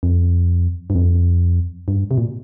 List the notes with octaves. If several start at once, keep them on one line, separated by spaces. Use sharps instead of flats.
F2
G2
F2
G2
C3
A#2